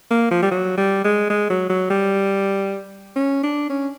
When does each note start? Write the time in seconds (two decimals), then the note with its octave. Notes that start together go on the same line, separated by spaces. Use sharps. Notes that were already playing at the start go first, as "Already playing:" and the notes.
0.10 A#3
0.31 F3
0.42 G3
0.51 F#3
0.77 G3
1.04 G#3
1.30 G#3
1.50 F#3
1.69 F#3
1.90 G3
3.15 C#4
3.43 D4
3.69 C#4